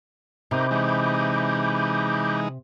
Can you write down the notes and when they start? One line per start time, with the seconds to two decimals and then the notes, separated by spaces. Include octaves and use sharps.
0.51 C3 D#4 A#4 B5 D6 G6
0.71 E3 G#3 D#4